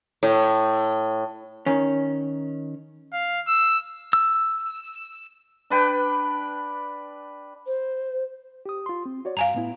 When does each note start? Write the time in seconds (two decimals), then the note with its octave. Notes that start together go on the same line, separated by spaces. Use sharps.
0.23 A2
1.66 D#3 C#4
3.13 F5
3.48 E6
4.13 E6
5.70 D4 B4 G5
7.66 C5
8.66 G4 D#6
8.86 F4 C6
9.06 C4
9.25 F#4 C#5 D5
9.37 G2 F5 G#5 A#5
9.54 A2 B3 E4